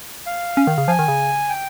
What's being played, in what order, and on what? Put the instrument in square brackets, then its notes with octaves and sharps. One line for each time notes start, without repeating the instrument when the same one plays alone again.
[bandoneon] F5
[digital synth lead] C#4
D#3
C#3
[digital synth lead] F3 [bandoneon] G#5
[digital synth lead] D#3
C#3
[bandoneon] G5